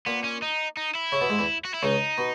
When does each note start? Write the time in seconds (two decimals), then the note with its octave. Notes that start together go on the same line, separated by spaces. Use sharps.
0.06 A#2 A#3 B3
0.24 C#4
0.42 D#4
0.77 D#4
0.95 E4
1.12 C#3 C#4
1.21 B2 B3
1.30 G#2 G#3
1.39 E2 E3
1.65 F#4
1.74 E4
1.83 C#2 C#3 D#4
2.18 B2